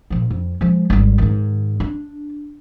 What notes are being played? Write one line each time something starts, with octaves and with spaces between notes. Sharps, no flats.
A#1 F3
F2
F3 G#3
G#1 G3
G#2 D#3
D4